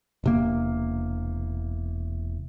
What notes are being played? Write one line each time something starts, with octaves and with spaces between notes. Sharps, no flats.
E1 C3 A#3